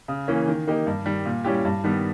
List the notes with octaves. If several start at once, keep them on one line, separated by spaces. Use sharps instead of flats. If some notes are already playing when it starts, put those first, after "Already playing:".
C#3
E3 A#3 C#4
D#3
A#3 D#4 G4
G2
D#3 G3
A#2
G3 C#4 E4 G4
G2
D#3 G3 B3